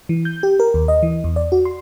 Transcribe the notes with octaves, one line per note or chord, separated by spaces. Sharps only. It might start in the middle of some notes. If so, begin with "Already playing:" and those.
E3
G6
G4
A#4
D#2
D#5
E3
E2
D5
F#4
C6